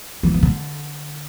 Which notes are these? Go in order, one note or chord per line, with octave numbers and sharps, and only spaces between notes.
E3
E3
D3